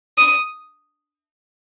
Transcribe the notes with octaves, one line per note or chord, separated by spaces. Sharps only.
D#6